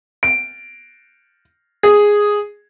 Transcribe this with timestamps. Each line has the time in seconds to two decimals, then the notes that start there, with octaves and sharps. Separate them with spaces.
0.23 D7
1.83 G#4